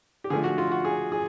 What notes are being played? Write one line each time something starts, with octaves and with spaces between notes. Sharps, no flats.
G4
D3 F3 A3 G#4
F#4
F4
F#4
G#4
G#4